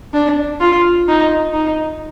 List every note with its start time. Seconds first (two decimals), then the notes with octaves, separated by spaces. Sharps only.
0.14 D4
0.60 F4
1.08 D#4
1.54 D#4